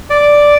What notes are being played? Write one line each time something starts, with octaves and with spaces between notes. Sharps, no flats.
D5